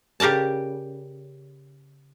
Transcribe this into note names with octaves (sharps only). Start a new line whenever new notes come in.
C#3 G4 A#4 D5 A5